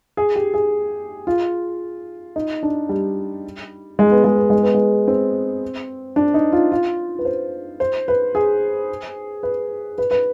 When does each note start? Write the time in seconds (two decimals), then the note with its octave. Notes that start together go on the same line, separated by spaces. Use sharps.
0.17 G#4
0.35 G4
0.54 G#4
1.27 F4
2.36 D#4
2.63 D4
2.89 G3
3.99 G#3
4.11 B3
4.24 G#3
4.37 B3
4.50 G#3
4.63 B3
4.74 G#3
5.07 C4
6.16 D4
6.34 D#4
6.52 F4
6.72 F4
7.19 B4
7.25 C5
7.80 C5
8.08 B4
8.35 G#4
9.43 B4
9.98 B4
10.11 B4